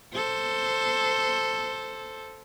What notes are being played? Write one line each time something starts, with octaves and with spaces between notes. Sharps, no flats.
A4 C5